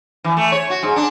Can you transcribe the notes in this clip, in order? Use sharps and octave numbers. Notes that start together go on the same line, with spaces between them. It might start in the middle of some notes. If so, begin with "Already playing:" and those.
E3
A3
C#5
F#4
G#2
D4